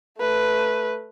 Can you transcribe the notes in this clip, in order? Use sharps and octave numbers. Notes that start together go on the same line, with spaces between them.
A3 B4